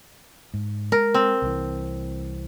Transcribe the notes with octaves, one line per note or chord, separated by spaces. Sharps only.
G#2
G#3 A#4
C4
C2 E3